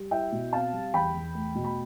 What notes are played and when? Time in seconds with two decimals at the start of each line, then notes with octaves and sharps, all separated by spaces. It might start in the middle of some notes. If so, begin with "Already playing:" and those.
Already playing: G3
0.11 E4 E5 G5
0.32 B2
0.53 C4 F5 A5
0.73 G3
0.94 E2 G5 B5
1.14 E2
1.35 A3
1.55 B2
1.64 B5